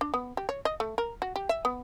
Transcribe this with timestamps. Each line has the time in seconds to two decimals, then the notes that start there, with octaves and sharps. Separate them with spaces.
0.01 D4
0.14 B3
0.37 G4
0.49 C#5
0.65 D#5
0.80 A3
0.98 A#4
1.22 F#4
1.36 G4
1.49 E5
1.65 B3